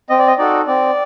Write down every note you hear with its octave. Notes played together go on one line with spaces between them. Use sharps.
C4 D#5
D5
D#5
D#4 F#4 A4 D5
C4 D5